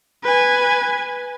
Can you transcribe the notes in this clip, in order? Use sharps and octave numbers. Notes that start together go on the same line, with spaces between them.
B4 G#5